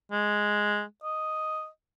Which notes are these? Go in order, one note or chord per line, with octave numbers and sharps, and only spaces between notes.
G#3
D#5